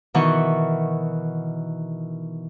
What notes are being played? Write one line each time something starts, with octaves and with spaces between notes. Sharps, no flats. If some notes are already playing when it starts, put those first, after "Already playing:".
B2 D#3 E3 F#5 C#6